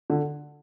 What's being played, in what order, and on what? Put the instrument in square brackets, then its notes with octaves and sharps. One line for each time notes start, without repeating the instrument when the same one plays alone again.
[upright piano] D3